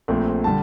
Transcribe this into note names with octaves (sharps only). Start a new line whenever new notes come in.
A#1 A#2 A3 C4
D3 G3 A5